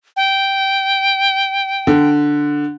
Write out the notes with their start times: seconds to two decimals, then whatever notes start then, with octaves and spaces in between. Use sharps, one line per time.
0.16 G5
1.87 D3